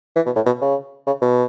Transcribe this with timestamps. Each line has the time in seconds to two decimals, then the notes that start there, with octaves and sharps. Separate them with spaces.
0.16 E3
0.26 B2
0.36 A2
0.46 B2
0.61 C#3
1.07 C#3
1.22 B2